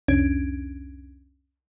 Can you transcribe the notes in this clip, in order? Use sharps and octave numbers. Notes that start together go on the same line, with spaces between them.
C2 F2 C#4 D4 G#6 D7